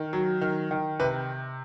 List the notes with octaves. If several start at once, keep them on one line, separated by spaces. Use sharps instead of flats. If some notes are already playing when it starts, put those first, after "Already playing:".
Already playing: D#3
F#3
D#3
D#3
C3 B4